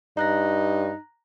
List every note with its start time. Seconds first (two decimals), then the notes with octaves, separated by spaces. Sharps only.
0.17 G2 D#4 A#5 F#6 A#6